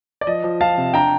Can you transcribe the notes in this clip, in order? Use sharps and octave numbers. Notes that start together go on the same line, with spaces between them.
D5
F3 D#5
F3
F3 F5 A5
C3
D4 G5 A#5